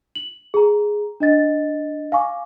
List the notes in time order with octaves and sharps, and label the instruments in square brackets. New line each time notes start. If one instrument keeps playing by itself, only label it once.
[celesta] F#7
G#4 A#5
D4 D#5 A6
F5 G#5 C#6 D6